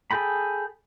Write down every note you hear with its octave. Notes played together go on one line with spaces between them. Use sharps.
G#4 A4 G5 B5